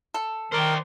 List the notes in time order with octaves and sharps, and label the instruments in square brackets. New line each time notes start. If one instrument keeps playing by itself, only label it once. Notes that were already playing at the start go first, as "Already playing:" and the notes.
[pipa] A4
[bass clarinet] D#3 [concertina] A#4 [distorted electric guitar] C5 D5